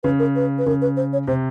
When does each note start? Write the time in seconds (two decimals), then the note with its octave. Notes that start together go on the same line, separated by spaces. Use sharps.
0.03 C#3 B4
0.19 A#4
0.36 B4
0.58 B4
0.66 C#3 A#4
0.82 B4
0.97 C5
1.13 C#5
1.28 C3 C5